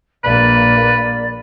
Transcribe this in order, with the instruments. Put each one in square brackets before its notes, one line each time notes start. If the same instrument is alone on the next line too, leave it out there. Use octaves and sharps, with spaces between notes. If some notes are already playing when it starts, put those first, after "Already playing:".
[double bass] A#1 A#3 [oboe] B4 [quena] D5